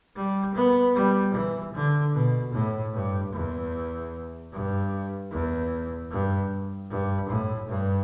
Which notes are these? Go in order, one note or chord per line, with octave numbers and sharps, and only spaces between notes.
G3
B3
G3
E3
D3
B2
A2
G2
E2
G2
E2
G2
G2
A2
G2